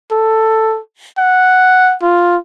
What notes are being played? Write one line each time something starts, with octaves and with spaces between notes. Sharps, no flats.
A4
F#5
F4